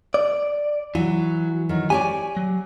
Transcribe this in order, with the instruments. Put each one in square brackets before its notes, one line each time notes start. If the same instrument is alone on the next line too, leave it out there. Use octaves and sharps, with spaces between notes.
[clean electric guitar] D5
[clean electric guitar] E3 [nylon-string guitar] F#3
[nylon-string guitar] D#3 F#3
[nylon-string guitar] G4 C#5 D5 [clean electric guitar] G#5
[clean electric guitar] F#3